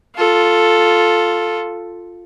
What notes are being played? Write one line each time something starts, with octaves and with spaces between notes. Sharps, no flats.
F4 A4